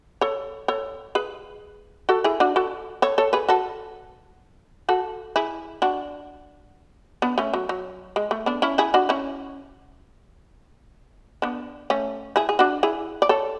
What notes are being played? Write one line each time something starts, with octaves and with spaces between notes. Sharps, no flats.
A4 C#5
A4 C#5
G#4 B4
F#4 A4
E4 G#4
D4 F#4
F#4 A4
A4 C#5
A4 C#5
G#4 B4
F#4 A4
F#4 A4
E4 G#4
D4 F#4
B3 D4
A3 C#4
F#3
F#3
G#3
A3
B3 D4
C#4 E4
E4 G#4
D4 F#4
C#4 E4
B3 D4
A3 C#4
E4 G#4
G#4
D4 F#4
E4 G#4
D5
A4 C#5